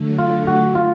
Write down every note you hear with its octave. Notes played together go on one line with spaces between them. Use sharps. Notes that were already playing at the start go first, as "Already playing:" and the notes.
Already playing: D3 F#3 A3
F4
F#4
F4